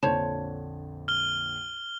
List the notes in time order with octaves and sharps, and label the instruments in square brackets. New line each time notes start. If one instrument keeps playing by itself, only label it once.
[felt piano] A#1 F2 D3 [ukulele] C5 C#5 A5
[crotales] F6 G7